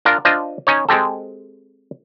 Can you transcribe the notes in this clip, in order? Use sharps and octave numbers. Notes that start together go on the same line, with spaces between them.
D4 F4 A#4
D4 F4 C5 D#5
C#4 D#4 C#5
G#3 C4 G4 A4